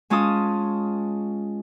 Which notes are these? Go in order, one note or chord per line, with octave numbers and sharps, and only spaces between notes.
G#3 C#4 F4 A5 D#6